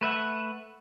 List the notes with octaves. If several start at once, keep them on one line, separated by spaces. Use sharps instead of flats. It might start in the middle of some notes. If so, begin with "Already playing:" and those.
A3 B4 E5 F#5